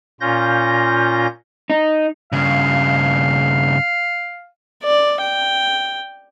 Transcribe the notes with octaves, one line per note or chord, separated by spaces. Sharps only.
A#2 C#4 F4 G6 A#6
D#4
G2 C#3 F5
D5
G5